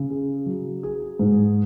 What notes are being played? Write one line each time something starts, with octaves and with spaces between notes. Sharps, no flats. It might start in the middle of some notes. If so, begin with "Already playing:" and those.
Already playing: C#3
G#4
F#3
G#4
G#2